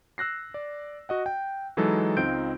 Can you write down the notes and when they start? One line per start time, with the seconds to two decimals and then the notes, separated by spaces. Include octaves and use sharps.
0.18 E6 F#6 A#6 C7
0.54 D5
1.09 F#4 D#5 F#5
1.26 G5
1.77 E3 F#3 G#3 D#4 A4
2.17 C#2 C4 D#4 F4 G6 D7